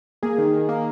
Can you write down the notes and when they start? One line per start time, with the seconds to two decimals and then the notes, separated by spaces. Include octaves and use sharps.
0.23 A#3 G#4
0.38 D#3
0.53 D#3
0.69 A#3